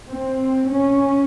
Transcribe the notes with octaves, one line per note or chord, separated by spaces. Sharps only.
C4
C#4